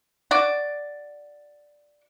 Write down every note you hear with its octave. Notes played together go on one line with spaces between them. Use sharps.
F#4 D5